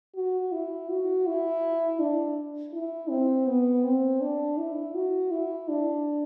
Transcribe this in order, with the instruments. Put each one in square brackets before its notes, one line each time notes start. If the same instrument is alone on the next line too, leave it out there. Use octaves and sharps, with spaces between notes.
[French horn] F#4
E4
F#4
E4
D4
E4
C4
B3
C4
D4
E4
F#4
E4
D4